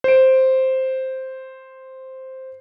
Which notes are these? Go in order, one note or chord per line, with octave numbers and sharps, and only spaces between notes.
C5 D7